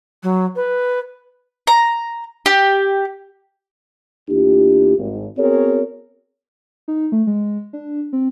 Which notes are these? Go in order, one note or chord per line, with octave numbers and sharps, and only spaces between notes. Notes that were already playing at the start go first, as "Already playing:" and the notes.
F#3
B4
A#5
G4
E2 A#3 D4 E4 F4 G4
G#1
B3 C4 F#4 G#4 A#4 C#5
D#4
A3
G#3
D4
C4